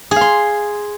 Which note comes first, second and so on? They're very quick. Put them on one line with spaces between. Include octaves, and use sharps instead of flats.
G#4 F5 C6